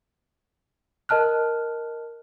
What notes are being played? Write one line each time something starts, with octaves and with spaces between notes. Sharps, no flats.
A#4 D#5 A5 F6 F#6